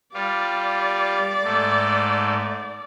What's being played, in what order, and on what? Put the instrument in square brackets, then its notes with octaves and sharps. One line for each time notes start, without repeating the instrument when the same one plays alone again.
[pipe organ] G3 F4 [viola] D5
[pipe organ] G#2 A3